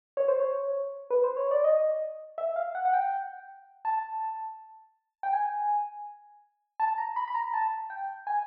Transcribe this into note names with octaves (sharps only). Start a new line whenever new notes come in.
C#5
C5
C#5
B4
C5
C#5
D5
D#5
E5
F5
F#5
F#5
G5
A5
G5
G#5
A5
A#5
B5
B5
A#5
A5
G5
G#5